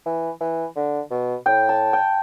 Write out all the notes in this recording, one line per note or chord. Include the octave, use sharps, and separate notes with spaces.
E3
E3
D3
B2
A2 G5
A5
G5